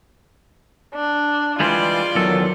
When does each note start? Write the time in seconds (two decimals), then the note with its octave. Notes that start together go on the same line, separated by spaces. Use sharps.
0.95 D4
1.60 E3 G3 G#3 F4 D5 C6
2.15 E2 D#3 F#3 A4